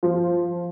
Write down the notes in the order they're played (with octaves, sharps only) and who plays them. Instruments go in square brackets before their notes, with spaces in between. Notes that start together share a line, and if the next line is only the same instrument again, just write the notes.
[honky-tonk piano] F3